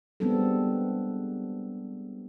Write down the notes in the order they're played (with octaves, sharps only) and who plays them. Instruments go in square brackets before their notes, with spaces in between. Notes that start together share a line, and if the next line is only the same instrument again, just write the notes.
[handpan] G3 G#3 B3 C4 D4 A4